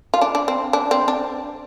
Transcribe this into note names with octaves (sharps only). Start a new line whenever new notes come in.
F4
D4
D4
C4
D4
C4
D4